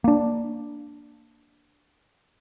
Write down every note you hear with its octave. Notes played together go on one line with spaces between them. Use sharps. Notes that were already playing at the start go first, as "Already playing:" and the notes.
A#3 D4